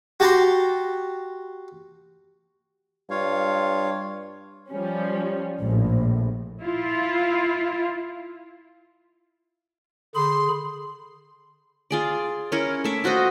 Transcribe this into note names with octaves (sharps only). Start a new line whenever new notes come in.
F#4 G4 A5 A#5 C6
G2 F4 C#5 F5
F3 G3 C#4
A#1 A2
E4 F4
D3 G#4 B5 C6
F4 G#4 D5
C#4 E4 A#4 C#5
A3 E5 D6
F4 F#4 C5 D#5